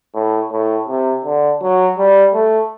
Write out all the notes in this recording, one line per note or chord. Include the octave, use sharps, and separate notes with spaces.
A2
A2
C3
D3
F#3
G3
A3